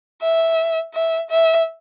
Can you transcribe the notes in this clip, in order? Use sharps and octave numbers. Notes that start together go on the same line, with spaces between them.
E5
E5
E5